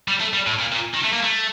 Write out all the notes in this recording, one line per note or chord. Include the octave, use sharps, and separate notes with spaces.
G3
A3
G3
A2
A#2
A#2
D#3
A3
A#3
A3